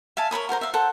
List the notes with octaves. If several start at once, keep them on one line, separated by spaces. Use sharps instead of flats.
E5 F5 G#5 A5
A#4 C#5 B5 D#6
F#4 A#4 C5 A#5
E5 F5
A4 C5 F#5 G5